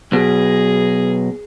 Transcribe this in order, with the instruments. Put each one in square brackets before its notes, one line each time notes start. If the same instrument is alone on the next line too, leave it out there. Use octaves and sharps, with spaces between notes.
[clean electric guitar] B1 B2 [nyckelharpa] G#4